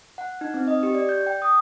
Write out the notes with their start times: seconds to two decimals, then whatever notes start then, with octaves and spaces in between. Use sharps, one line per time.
0.18 F#5
0.41 D#4
0.54 C4
0.68 D#5
0.83 G4
0.95 D5
1.09 G6
1.27 G5
1.42 D#6